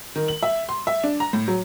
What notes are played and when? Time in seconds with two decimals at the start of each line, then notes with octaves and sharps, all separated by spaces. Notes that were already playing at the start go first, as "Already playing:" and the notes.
0.16 D#3
0.28 F#7
0.43 E5
0.69 C6
0.87 E5
1.04 D4
1.20 A#5
1.33 A2
1.48 F#3